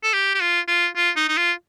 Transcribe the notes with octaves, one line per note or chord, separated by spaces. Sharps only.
A4
G4
G4
F4
F4
F4
D#4
D#4
F4